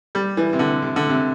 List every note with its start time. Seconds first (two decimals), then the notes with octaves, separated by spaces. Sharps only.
0.15 G3
0.37 E3
0.53 C3
0.59 D3
0.82 C3
0.96 D3
1.09 C3